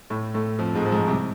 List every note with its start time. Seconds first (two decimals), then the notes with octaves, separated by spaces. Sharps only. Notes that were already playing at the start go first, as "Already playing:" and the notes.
0.10 A2 A3
0.34 A2 A3
0.59 F2 F3
0.75 G#2 G#3
0.85 F3
0.91 G#2 G#3
1.07 C2 C3